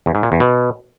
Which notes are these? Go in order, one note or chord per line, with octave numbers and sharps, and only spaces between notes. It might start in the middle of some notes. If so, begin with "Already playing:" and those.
E2
G#2
A#2
E2
B2